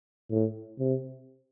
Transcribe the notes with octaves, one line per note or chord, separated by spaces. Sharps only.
A2
C3